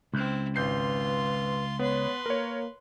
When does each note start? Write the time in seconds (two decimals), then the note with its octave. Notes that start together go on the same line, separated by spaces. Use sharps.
0.14 C#2 C4 E4
0.56 G#1 F4 B4 C6 G6 C7
1.79 B3 B4 C#5 C6
2.26 A#3 A#4 C#5